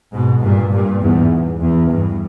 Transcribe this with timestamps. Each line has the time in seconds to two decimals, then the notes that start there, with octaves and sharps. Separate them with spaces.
0.13 G#2 B2
0.42 G2 A#2
0.72 G2 A#2
1.02 E2 G#2
1.61 E2
1.91 G2